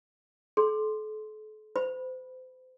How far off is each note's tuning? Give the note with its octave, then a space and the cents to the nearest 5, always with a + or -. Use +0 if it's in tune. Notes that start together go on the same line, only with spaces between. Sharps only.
A4 -40 C6 +0
C5 -35 B5 -5